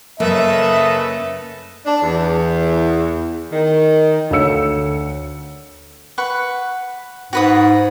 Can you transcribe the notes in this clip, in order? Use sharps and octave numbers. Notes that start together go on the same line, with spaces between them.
F#2 C#3 A#3 A4 B4 D#5 E5
D4
E2
D#3
D2 A4 C#5 F5 E6 C#7
B4 F#5 C#6
G#2 F#4 B4 D#6